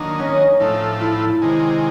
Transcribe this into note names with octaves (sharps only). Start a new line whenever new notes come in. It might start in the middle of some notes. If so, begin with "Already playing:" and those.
Already playing: D#3 F#3 A#3 D4 D#4
C#4
A2 F3 A3 D#4
E4
C3 D#3 G#3